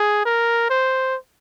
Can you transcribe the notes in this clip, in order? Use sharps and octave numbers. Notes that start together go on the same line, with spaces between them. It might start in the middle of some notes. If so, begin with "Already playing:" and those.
Already playing: G#4
A#4
C5